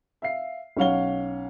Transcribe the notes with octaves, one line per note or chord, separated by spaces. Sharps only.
E5 F5 C7
B1 C#4 C#5 F5 F#5 G7